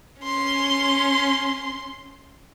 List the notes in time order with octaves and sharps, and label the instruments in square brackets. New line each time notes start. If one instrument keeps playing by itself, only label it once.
[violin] C#4 C6